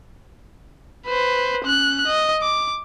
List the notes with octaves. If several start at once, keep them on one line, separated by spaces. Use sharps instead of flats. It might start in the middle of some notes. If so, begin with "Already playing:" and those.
B4 C5
C#4 F#6
D#5
D6